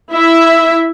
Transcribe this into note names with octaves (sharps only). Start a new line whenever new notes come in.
E4 E5